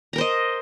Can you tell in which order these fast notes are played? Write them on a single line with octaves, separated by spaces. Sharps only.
A#5 A#4 C5 D#5